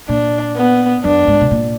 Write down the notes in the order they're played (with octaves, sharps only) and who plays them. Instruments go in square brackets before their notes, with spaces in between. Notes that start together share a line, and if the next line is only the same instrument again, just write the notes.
[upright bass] A#2 [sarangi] D4
[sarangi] B3
[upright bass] F#2 [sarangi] D4
[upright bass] G#2
B2
A#2